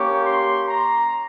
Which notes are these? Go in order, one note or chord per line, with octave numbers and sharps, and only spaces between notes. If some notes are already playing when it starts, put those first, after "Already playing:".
Already playing: A#3 C#4 G4 C#6
C6
A#5